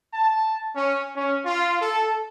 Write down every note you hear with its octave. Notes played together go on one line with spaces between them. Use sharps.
A5
C#4
C#4
F4
A4